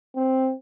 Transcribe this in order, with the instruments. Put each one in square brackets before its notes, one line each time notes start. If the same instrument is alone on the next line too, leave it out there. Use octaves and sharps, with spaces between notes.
[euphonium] C4